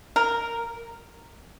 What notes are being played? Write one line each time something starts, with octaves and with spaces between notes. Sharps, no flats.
A#4